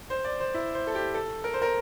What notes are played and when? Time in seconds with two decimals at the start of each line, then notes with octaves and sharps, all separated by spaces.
0.10 C5
0.25 D5
0.40 C5
0.54 E4
0.75 C5
0.87 A4
0.95 G4
1.14 A4
1.44 A#4
1.54 C5
1.62 A#4